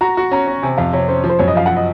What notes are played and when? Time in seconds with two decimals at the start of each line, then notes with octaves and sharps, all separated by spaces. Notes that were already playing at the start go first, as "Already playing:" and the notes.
0.01 F#4 A#5
0.17 F#4
0.31 C#4 A#5
0.47 C#4
0.63 C3 G#5
0.78 F2 F5
0.93 C3 C#5
1.08 C#4 C5
1.24 F3
1.30 C5
1.39 F#2 C#5
1.48 D#5
1.55 F3 F5
1.66 F#5
1.76 D#5